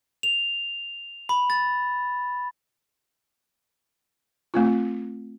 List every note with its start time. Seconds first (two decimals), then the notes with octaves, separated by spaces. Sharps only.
0.23 F7
1.29 B5
1.50 A6
4.54 A3 C4 F4